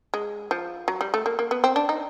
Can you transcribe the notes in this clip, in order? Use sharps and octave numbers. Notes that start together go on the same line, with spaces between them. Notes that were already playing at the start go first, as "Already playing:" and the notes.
G#3
F3
F#3
G3
A3
A#3
A#3
B3
C4
D4
D#4